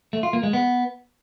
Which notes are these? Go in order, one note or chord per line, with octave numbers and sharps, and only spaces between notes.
A3
F4
A#3
G#3
B3